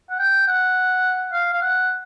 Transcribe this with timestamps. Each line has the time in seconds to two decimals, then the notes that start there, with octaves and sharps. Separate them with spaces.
0.10 F#5
0.19 G5
0.48 F#5
1.33 F5
1.53 F5
1.62 F#5